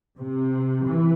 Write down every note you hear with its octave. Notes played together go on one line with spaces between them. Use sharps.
C3
E3